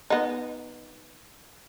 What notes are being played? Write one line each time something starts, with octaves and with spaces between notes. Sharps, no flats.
B3 D#4